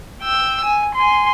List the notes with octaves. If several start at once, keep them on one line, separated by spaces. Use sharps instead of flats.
G5 E6
G#5
G#5 C6